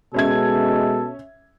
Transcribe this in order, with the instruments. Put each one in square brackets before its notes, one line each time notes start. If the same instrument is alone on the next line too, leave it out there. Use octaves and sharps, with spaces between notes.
[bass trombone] B2 [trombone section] G#3 [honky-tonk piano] C#4 E5 G#6 [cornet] A4